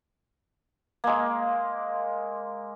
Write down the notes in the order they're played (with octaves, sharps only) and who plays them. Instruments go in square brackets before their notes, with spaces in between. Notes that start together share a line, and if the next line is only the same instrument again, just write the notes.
[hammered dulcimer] G#3 A#3